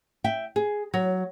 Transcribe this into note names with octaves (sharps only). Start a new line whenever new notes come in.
E5 G5
G#4
F#3